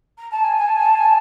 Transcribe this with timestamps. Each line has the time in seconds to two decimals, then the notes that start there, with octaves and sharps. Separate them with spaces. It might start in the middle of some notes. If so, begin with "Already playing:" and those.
0.18 A#5
0.31 A5
0.44 G#5
0.57 G#5
0.66 A5
0.75 G#5
0.85 A5
0.94 G#5
1.03 A5